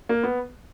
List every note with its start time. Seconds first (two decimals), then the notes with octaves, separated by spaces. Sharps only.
0.09 A#3
0.23 B3